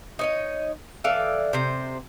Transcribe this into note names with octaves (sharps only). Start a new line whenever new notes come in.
D#4 C#5 D#5
E3 A4 D5 F5
C3 C5